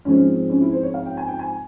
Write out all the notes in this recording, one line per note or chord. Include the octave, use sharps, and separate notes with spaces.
G#2 F3 G#3 C4 C#4
C#4
E4
C5
C#5
F5
G5
G#5
G5
G#5